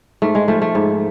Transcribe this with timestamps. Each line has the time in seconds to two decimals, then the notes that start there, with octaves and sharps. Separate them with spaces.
0.22 G#2 A3
0.35 G#3
0.48 F3 A3
0.62 A3
0.75 G#2